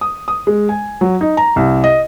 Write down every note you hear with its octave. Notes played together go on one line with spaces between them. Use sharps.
D#6
D#6
G#3
G#5
F#3
D#4
A#5
C2
D#5